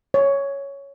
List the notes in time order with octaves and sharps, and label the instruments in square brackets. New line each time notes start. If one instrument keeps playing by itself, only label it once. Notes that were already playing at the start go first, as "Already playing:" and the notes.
[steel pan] C#5